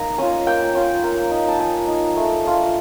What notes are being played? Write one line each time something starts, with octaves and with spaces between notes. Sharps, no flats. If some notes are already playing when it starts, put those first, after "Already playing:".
Already playing: A#3 D#4 A#5
C#4 F4 G#5
A#3 G5
C#4 F4
A#3
D#4
A5
A#3 G#5
D#4
A3
D4 F4